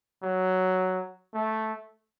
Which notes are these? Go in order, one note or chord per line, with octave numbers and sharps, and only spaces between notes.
F#3
A3